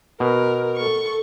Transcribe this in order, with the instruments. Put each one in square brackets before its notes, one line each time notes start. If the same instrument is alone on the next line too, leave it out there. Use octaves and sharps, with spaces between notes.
[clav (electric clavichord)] B2 [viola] A#4
[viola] A4 C#6